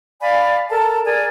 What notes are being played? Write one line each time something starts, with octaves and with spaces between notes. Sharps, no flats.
D5 F5 G#5 B5
A4 A#4 A5
G#4 A#4 D5 G#5